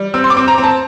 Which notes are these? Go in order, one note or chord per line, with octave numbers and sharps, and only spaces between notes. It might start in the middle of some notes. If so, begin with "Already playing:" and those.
Already playing: G3
C4 E6
C6
D6
C4
A#5
C4
A5